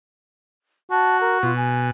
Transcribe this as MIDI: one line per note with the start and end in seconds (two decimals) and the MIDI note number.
0.91 1.54 66
0.91 1.19 81
1.21 1.38 70
1.43 1.91 47
1.43 1.55 65
1.56 1.88 80